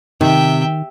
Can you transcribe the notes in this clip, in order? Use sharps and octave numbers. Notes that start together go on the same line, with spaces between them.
C3 D#3 E5 G5